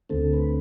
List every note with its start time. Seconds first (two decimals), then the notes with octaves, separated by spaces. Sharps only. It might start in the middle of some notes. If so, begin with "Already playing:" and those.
0.09 D2 D3 A3 C4 A4
0.33 B4